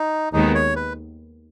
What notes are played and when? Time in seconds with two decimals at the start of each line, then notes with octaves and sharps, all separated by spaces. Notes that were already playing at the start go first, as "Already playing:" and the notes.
Already playing: D#4
0.33 D#2 D#3 G#3 B3 D#4
0.55 C#5
0.76 B4